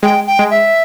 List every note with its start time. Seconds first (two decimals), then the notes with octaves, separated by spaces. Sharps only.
0.03 G#3 G5
0.27 G5
0.39 G#3
0.51 E5